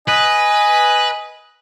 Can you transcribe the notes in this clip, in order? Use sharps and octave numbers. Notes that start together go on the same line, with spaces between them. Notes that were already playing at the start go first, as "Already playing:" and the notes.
B4 D#5 G#5